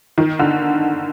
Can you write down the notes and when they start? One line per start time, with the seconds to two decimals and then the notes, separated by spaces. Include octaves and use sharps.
0.18 D#3
0.39 D3